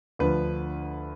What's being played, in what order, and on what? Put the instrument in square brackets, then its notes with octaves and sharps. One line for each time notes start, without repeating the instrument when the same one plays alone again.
[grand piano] D2 D3 F3 B4